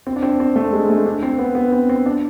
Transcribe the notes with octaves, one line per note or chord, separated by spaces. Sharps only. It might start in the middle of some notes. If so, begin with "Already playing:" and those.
C4
D4
C4
C4
A3
G#3
A3
D4
C4
B3
B3
C4
C4
D4